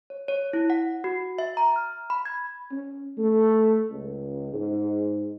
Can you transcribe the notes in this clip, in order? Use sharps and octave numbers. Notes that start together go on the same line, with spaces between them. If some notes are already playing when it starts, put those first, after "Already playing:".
C#5
C#5
E4
F#5
F#4
E5
A#5
F6
B5
G#6
C#4
A3
C#2
G#2